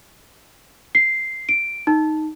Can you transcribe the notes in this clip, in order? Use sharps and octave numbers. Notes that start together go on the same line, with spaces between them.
C7
D7
D#4